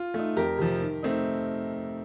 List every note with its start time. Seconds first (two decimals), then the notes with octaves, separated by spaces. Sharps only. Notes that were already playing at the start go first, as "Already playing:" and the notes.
Already playing: F4
0.14 A3 D#4
0.37 F2 G4 A#4
0.59 C3 F3
0.81 D#3
1.03 A3 C4 D#4